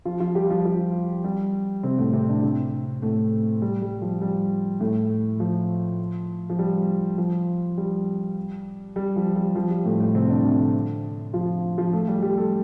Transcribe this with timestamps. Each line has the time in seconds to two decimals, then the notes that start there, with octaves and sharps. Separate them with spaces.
0.05 F3 F4
0.20 F3 F4
0.35 G3 G4
0.50 F3 F4
0.65 F3 F4
1.24 G3 G4
1.83 C3 C4
1.99 A2 A3
2.13 C3 C4
2.28 D3 D4
2.43 C3 C4
3.02 A2 A3
3.62 G3
3.82 G3
4.02 F3
4.21 G3
4.80 A2 A3
5.40 F3
6.50 F3
6.59 G3
7.18 F3
7.78 G3
8.96 G3
9.16 F3
9.36 G3
9.55 F3
9.70 G3
9.85 A2 A3
10.00 A2 A3
10.15 C3 C4
10.30 D3 D4
10.44 C3 C4
10.59 D3 D4
11.33 F3 F4
11.78 F3 F4
11.93 A3 A4
12.08 G3 G4
12.22 G3 G4
12.37 A3 A4